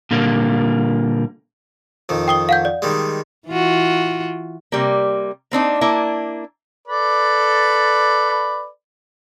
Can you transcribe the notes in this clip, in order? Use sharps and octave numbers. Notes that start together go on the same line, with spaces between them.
A#2 D3 G3 A#3
F2 D#3
G5 D#6 G7
F5 F#5 G6
D5
D#3 G3 G#3
E3 F4 F#4
C3 G3 A#3
A#3 C4 D4 D#4
A#3 D4 E4
A4 B4 D5